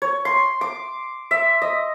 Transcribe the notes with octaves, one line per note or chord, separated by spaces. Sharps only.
C#5
C6
D6
E5
D#5